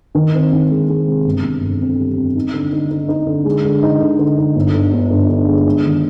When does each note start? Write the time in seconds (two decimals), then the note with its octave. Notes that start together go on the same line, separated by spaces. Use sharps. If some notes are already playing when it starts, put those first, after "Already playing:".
0.15 D#3
0.34 C4
0.53 D#3
0.71 G#3
0.89 G#3
1.07 C3
1.25 G1
1.43 G1
1.63 F2
1.81 F2
1.98 G3
2.17 F2
2.36 D#4
2.53 D3
2.72 D#4
2.91 D#4
3.08 D#4
3.27 D3
3.45 G#3
3.64 D3
3.83 D#4
4.00 D3
4.19 D3
4.38 D#4
4.55 G1
4.74 D3
4.93 G1
5.11 D3
5.29 D3
5.47 G#3
5.66 D4
5.84 D#3